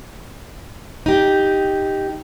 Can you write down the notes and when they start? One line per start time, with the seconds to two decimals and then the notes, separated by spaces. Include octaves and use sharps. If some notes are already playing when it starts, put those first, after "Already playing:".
1.06 D#4 G4